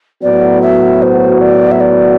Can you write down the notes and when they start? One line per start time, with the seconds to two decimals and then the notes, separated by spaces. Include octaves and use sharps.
0.23 A2 F#3 B3 F#4 D5
0.62 E5
1.02 C5
1.41 D5
1.71 E5
1.80 D5